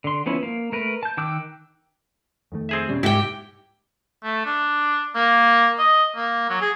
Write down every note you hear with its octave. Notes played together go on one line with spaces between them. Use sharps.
D3 C6
F3 B3 C#4 E4
A#3
A3 A#4 B4
A5 G6
D#3 G5 D6 E6 F#6
F2 D#3 A3
C4 G#4 E5
E1 B2 G3 C#4
C2 G#2 E4 F#4 G4 G5
A3
D4
A#3
D#5
A#3
F#3
G#4